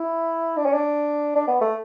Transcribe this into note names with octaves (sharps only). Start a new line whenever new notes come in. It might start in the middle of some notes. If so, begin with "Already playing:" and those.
Already playing: E4
D4
C#4
D4
D4
B3
A3